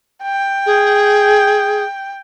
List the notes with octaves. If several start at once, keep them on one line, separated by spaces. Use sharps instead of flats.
G5
G#4